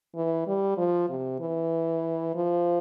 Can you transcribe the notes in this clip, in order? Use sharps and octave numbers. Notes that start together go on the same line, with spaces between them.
E3
G3
F3
C3
E3
F3